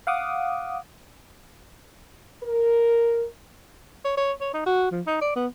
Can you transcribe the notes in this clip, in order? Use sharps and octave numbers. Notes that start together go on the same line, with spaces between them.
F5 F#5 D6 D#6
A#4
C#5
C#5
C#5
D#4
F#4
F3
D#4
D5
B3